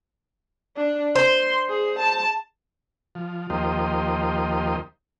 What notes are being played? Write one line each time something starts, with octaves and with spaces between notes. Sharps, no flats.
D4
C5 C6
G#4
A5
F3
D#2 F3 A#3 G4 C5 D#5